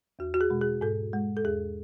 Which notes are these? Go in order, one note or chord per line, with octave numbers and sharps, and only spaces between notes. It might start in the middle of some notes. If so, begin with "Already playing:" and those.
E2 F#4
F#4
G#4
B2 G#3
G#4
G#2 A4
G#3
A4
E2 G#4